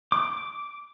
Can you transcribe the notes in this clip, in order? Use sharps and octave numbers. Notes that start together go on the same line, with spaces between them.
D6